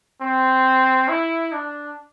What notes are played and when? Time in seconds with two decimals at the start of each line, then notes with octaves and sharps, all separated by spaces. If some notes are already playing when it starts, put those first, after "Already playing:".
0.21 C4
1.09 E4
1.52 D4